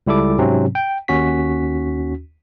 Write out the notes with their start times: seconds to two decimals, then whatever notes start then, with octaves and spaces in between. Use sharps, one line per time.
0.07 C#2 G3 E4 A4 D6
0.38 G#2 C3 F#3 C4 C#4
0.75 G5
1.08 D#2 C#4 F#4 B6